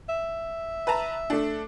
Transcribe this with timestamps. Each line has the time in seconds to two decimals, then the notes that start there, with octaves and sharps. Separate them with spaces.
0.09 E5
0.87 B4 A5 A#5
1.30 A3 D4